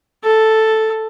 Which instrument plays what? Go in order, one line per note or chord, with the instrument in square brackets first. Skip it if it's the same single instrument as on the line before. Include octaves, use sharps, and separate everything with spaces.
[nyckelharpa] A4